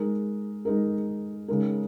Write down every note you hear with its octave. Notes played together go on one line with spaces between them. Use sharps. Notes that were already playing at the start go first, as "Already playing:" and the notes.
Already playing: G#3 D#4 A#4
G#3 D#4 A#4
C#3 G#3 D#4 A#4